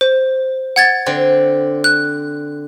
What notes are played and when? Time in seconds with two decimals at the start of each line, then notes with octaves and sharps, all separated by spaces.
0.01 C5
0.76 F#5 G#6 A6
1.06 D3 C4
1.84 F#6